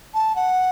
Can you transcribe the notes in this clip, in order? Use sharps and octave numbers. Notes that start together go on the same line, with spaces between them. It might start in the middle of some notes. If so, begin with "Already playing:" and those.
A5
F#5